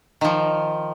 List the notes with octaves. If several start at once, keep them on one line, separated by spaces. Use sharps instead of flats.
D#3 F3